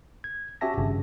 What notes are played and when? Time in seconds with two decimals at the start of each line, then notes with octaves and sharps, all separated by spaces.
0.24 G#6
0.61 C#4 F#4 G4 E5 A5 A#6
0.78 G#1 G2 C#3